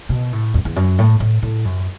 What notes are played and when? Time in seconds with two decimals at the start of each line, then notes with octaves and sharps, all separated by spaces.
0.09 B2
0.32 A2
0.54 E2
0.65 E2
0.76 F#2
0.99 A2
1.20 A2
1.42 A2
1.65 F#2